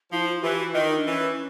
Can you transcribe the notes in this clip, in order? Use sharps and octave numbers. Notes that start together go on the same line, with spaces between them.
F3 E4
E4
F4
E3 G4
F#4
D#3 F4
D#4
D4
E3 C#4